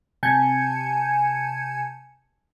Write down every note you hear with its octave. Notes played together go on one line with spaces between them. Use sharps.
C3 G#5 A5 G6 G#6 C#7